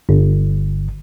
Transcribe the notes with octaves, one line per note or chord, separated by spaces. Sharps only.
G1